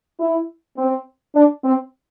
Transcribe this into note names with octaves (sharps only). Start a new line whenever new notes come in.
E4
C4
D4
C4